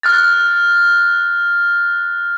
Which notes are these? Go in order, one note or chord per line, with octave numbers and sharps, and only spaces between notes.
F6 F#6 A6